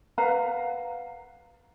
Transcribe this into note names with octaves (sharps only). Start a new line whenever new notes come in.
B4 F5 F#5 A#5